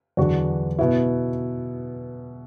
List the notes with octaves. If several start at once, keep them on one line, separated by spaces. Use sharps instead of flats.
E2 D3 F#3 D4 F#4
B2 B3 E4